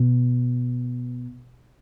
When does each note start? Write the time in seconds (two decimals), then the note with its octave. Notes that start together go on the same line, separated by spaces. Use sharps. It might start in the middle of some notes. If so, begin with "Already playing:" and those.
Already playing: B2